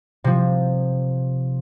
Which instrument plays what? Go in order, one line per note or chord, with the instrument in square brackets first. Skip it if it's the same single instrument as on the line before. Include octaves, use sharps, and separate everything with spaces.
[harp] C3 F3